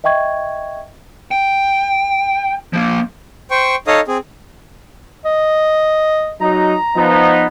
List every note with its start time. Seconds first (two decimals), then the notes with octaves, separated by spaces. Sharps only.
0.04 D#5 E5 G5 C#6 G#6
1.31 G5
2.73 F3 A#3
3.51 C5 G5 C#6
3.87 D#4 A4 C#5 D#5 F5 D#6
4.08 C4 G#4
5.25 D#5
6.41 F#3 D#4 A#5
6.96 F3 B3 D#4